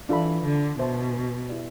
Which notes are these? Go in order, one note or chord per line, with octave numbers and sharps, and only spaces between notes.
E3 D4 F4 A4 E5 B5
D3
B2 C5 E5 A5 C6
E4 G4 D5